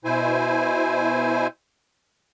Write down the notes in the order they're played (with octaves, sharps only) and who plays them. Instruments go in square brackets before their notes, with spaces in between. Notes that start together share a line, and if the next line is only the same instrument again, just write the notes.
[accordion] B2 E4 C5 G#5